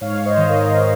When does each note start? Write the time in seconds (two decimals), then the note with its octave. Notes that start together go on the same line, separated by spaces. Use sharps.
0.01 G#2 C#5 F5
0.25 C5 D#5
0.37 D#3
0.50 A#4